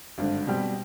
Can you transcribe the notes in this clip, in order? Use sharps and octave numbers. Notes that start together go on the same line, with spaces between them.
G#1 G2 D3
B2 G3 C4 G4